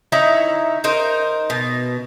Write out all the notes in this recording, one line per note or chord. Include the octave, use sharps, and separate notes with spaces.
D#4 E4 C#5 A#5
D#4 A#4 C5
B2